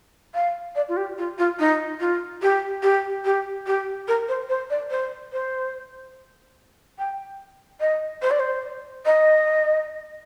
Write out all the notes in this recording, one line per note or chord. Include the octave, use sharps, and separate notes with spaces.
F5
D5
F4
G4
F4
F4
D#4
F4
G4
G4
G4
G4
A#4
C5
C5
D5
C5
C5
G5
D#5
C5
D5
C5
D#5